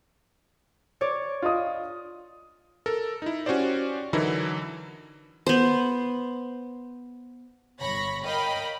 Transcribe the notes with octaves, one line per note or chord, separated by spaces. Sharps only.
C#5 D5
F4 D#5 D#6
A4 A#4
D#4 E4
C#4 F#4 G4 C5 D5
D3 E3 F#3 D#4 E4 A#4
B3 C5
G1 C#5 B5 C#6 A#6
A#4 C#5 D#5 F5 G5 B5